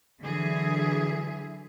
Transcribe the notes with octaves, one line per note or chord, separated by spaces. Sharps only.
D3 E3 F#3 G#4 E5